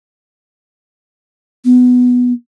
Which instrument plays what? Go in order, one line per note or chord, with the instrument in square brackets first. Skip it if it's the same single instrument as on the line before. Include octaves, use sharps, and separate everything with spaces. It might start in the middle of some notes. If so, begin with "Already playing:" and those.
[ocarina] B3